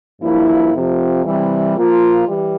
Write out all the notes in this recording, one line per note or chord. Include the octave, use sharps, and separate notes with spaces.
G2 F3 A#3 E4
F2 C3 F3
C3 E3 G3
F3 A#3 F4
E3 G3